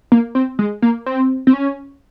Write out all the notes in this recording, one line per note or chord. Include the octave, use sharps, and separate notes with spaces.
A#3
C4
G#3
A#3
C4
C4
C#4